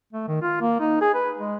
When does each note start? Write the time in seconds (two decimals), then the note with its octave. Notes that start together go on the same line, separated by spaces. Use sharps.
0.13 A3
0.28 D#3
0.42 F4
0.61 A#3
0.80 D#4
1.01 G#4
1.14 B4
1.38 G#3